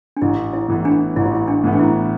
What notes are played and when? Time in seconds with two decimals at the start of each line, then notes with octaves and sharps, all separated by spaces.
0.17 D4
0.22 A1 E4
0.53 E4
0.68 A2 E3 B3 E4
0.85 D4
1.16 A1 E4
1.26 F4
1.35 E4
1.48 D4
1.64 A2 E3 B3
1.73 D4
1.79 E4